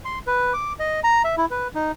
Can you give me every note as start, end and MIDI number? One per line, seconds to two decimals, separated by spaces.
0.05 0.19 84
0.27 0.53 71
0.53 0.73 86
0.79 1.00 75
1.04 1.22 82
1.24 1.35 76
1.37 1.45 64
1.51 1.68 71
1.75 1.91 63